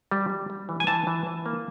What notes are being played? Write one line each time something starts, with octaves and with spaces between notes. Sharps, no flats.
G3
G3
G3
E3
G#5
E3 A5
E3
E3
A#3